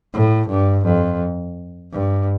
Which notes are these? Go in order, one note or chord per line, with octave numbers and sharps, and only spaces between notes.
A2
G2
F2
G2